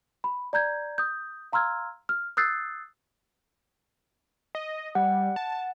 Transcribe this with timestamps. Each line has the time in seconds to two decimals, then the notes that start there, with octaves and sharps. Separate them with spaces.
0.24 B5
0.53 D5 A#5 G6 G#6
0.98 D#6 G6
1.52 F5 A#5 C6 E6 F6 G#6
2.09 F6
2.37 D#6 E6 F#6 G6 A6 C7
4.55 D#5
4.95 G3 F#5
5.36 A5